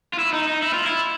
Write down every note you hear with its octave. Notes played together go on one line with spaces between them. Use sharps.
F4
E4
D#4
D#4
E4
F4
E4